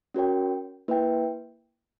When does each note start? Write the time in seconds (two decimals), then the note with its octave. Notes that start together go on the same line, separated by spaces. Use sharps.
0.14 C#4 F#4 A#4 C#5 G5
0.88 A#3 E4 B4 E5 G5